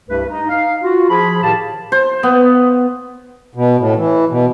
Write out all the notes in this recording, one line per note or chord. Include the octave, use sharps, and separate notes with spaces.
C2 G2 A3 G4 B4
D#4
D#4 F5
F4 F#4
F3 G#4 B5
A2 D#3 G4 F5 A5
C5
B3
B2
A2
E3
B2